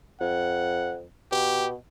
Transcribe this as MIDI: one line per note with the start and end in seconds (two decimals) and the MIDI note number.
0.21 1.05 41
0.21 0.96 78
1.32 1.73 47
1.32 1.68 67